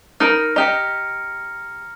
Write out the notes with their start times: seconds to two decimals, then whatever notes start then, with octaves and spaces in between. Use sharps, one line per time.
0.20 D#4 A#4 B5 F6 A#6
0.56 G4 D#5 A#5 F6 C#7